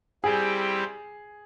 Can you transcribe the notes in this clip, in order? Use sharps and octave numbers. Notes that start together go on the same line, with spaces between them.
G3 C4 E4 G4 G#4